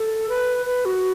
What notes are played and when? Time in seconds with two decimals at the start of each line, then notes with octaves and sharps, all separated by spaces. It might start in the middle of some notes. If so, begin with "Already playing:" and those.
Already playing: A4
0.29 B4
0.66 B4
0.85 F#4